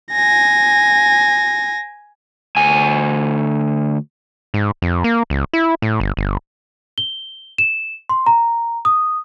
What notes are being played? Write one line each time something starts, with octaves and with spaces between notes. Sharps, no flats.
G#5 A#6
D2 G#5
G#2
F2
A#3
C#2
E4
A2
G1
G1
G7
E7
C6
A#5
D#6